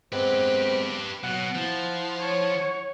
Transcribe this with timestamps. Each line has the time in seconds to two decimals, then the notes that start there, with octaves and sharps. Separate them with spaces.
0.12 G#3 B3 C4 G4 B4 C5
1.23 B2 F#3 F#5 F#6
1.55 F3 E4
2.21 C#5